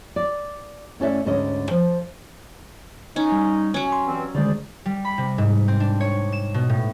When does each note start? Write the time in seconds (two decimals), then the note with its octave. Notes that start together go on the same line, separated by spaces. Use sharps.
0.16 D5
1.00 A2 C#4 A4 D5 E5
1.25 D2 G#2 D3 C#4 D#5
1.71 F3
3.16 C#4 D#4
3.32 G3
3.74 F#3 C#4
3.92 C6
4.06 G2 E3 C4
4.35 D3 D#3 G#3 G#4 C5 D5
4.86 G3
5.05 B5
5.18 C3
5.38 G#2
5.68 C4
5.80 D4
6.00 C#5
6.32 E7
6.54 B2
6.69 A2